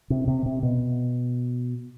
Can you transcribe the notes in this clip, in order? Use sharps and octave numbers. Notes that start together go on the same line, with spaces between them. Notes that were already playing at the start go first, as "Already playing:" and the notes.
C3
C3
C3
B2